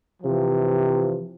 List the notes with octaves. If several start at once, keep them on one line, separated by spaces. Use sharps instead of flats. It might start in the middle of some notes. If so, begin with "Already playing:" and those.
C3 E3 F3